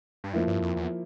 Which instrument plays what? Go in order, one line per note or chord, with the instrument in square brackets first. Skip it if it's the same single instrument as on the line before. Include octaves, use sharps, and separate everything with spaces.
[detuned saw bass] G2
[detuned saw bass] F2 [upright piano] F3 A#3 E4
[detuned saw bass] G2
F2
E2